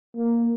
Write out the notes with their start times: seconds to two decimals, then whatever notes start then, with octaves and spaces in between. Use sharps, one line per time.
0.17 A#3